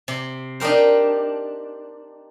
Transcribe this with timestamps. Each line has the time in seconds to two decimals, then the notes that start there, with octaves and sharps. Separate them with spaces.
0.08 C3
0.60 D4 D#4 G4 A#4 C5